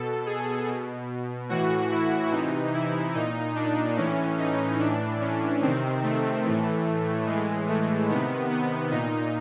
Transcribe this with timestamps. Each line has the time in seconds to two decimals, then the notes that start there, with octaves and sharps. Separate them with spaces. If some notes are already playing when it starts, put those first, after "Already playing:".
Already playing: B2 A4
0.26 G#4
0.68 B2
1.49 A2 E3 F#4
1.91 E4
2.32 C3 E3 D#4
2.74 E4
3.14 A#2 D#4
3.55 D4
3.97 A2 E3 C#4
4.38 D#4
4.79 A2 E3 D4
5.21 C#4
5.62 C3 D#3 C4
6.03 A3
6.44 A2 E3
7.26 A2 E3 G#3
7.68 A3
8.08 C3 D#3 B3
8.50 B3
8.91 A#2 D#4